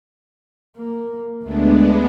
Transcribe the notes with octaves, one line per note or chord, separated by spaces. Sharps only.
A#3
D2 G#3 A3 B3 D4